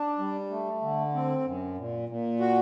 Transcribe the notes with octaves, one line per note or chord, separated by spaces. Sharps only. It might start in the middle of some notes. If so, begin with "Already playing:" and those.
Already playing: D4
G3
A3
D3
C4
F#2
A#2
A#2
F#4